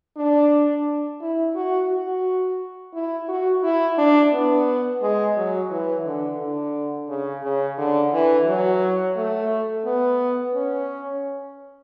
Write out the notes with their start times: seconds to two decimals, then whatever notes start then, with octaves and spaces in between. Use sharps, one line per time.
0.17 D4
1.21 E4
1.55 F#4
1.91 F#4
2.94 E4
3.29 F#4
3.63 E4
3.98 D4
4.32 B3
5.02 G#3
5.36 F#3
5.71 E3
6.05 D3
6.39 D3
7.09 C#3
7.43 C#3
7.78 D3
8.13 E3
8.47 F#3
9.16 A3
9.85 B3
10.54 C#4